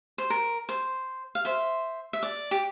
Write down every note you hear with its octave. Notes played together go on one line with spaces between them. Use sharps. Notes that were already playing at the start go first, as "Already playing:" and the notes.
C5
A#4
C5
F5
C5 E5
E5
D5
G4